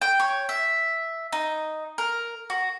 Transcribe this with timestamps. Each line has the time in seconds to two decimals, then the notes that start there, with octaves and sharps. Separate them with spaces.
0.02 G5
0.20 C#5
0.49 E5
1.33 D#4
1.98 A#4
2.50 F#4